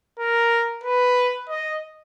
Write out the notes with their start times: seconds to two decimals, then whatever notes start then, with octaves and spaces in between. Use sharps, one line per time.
0.19 A#4
0.84 B4
1.49 D#5